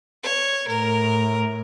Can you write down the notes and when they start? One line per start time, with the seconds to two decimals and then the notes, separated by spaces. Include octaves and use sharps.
0.23 C#5
0.68 A2 A#4